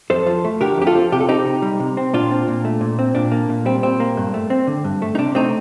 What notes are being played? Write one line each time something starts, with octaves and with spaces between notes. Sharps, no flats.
F2 A4 C5
F3
A3
D3 G4 A#4
F2 G4
F4 A4
F3
C3 G4
A4
C4 D#4 G4
C3
G3
C3
C4
A#2 D4 F4
C4
A#2
A3
A#2
C4
A#2 D4
A#3
A#2
G3 C4
A#2 C4
A#3
G2
A3
C4
D3
G2
A3
D#4
C3 D4
A3 C4 D#4